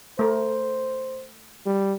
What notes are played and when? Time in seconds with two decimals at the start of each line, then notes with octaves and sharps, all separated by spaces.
0.19 A3 A#4 C5
1.66 G3